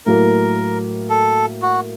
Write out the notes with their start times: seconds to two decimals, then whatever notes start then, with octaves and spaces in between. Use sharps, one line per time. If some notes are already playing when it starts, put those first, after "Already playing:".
0.06 A2 F#3 A#3 A#4
1.09 A4
1.62 F#4